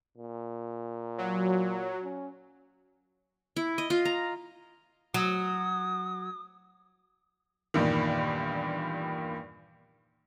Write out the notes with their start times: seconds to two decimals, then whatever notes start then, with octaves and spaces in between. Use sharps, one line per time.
0.17 A#2
1.18 F#3
2.03 C#4
3.56 E4
3.78 D#5
3.90 F4
4.05 A#5
5.14 F#3 D#6
7.74 E2 G2 A#2 D#3